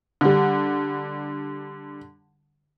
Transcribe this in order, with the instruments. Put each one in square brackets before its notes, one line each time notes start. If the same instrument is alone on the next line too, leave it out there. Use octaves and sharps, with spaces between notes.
[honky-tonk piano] D3 G3